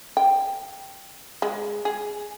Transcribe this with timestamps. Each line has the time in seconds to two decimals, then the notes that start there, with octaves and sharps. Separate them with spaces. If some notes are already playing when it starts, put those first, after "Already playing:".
0.17 G5
1.42 G#3
1.85 G#4